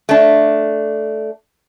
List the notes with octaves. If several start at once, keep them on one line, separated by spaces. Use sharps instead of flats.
A3 D4